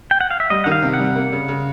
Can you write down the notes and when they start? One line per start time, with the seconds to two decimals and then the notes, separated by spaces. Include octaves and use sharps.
0.11 G5
0.21 F#5
0.30 F5
0.40 E5
0.50 G3 D#5
0.64 D#3 F#5
0.72 F5
0.82 C3
0.94 F#5
0.99 G3
1.16 A#3
1.32 C#3
1.48 C#3